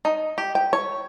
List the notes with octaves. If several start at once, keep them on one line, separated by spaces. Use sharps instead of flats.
D#4
G4
G5
C#5